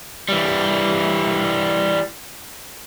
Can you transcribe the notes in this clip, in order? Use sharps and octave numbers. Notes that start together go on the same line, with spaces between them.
E3 G3